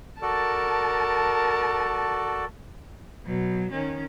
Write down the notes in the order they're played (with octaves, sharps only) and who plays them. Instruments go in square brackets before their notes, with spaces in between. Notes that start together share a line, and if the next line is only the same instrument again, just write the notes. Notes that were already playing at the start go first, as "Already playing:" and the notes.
[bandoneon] F#4 A4 D5 [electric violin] A#4 A5
[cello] B2 F#3
D#3 C#4